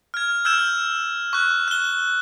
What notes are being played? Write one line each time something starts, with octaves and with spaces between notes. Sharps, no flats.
F6 G#6
E6 F6 G6 G#6 E7
G6
C#6 F#6
F#6 G7